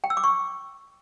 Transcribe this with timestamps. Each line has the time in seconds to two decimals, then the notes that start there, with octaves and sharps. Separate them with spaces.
0.04 G5
0.10 E6
0.17 D6
0.24 C#6